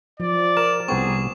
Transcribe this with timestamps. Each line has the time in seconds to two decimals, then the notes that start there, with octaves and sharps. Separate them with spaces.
0.20 F3 D5
0.57 A#4 E7
0.88 C2 B3 C4 G#4 C#6